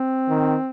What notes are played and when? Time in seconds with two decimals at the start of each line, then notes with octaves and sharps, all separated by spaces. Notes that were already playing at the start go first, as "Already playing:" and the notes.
Already playing: C4
0.30 D#3